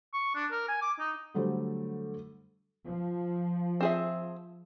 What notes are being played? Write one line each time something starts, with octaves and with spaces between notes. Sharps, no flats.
C#6
D4
A#4
G#5
D6
D#4
D3 F#3 G3 A3 C5
F3
C4 G#4 E5